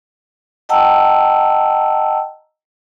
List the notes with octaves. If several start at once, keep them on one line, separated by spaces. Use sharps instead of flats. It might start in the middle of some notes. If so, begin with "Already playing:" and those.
D#5 F#5 G5 A5 A#5 E6